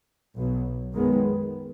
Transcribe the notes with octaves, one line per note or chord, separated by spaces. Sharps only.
B1 B2 F#3
F#2 D#3 G#3 B3